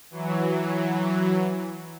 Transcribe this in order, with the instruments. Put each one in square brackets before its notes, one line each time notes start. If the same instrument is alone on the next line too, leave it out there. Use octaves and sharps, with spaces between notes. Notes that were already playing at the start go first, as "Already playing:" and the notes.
[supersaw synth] E3 F#3